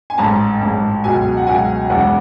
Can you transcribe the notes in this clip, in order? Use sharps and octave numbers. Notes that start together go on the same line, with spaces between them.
G#5
A1 G#2 G#3 A5
A1 G#2 G#3
C#2 B2 F#3 G#5
F#5
C#2 B2 F#3 G#5
E1 E2 C#3 E3 G#3 F#5